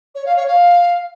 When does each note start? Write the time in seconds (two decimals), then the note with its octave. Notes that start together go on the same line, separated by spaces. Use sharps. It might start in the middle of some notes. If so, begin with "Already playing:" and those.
0.14 C#5
0.25 F5
0.36 C#5
0.47 F5